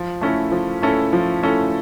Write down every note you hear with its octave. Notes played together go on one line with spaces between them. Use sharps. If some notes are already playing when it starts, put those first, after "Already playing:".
Already playing: F3
A3 C#4 E4 A4
F3
A3 C#4 E4 A4
F3
A3 C#4 E4 A4